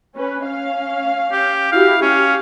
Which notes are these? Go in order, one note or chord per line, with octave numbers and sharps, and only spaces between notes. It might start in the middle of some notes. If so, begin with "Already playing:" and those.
C#4 B4
C#4 F5
G4
E4 F#4 G4 F5
C#4 G4 F5